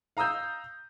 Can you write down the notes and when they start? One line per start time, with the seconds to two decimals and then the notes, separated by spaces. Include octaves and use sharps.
0.17 F5 A#5 D#6 E6 G6